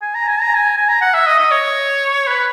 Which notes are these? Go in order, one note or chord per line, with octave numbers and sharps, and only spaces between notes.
G#5
A#5
G#5
A#5
G#5
G#5
A#5
F#5
E5
D#5
D#5
C#5
B4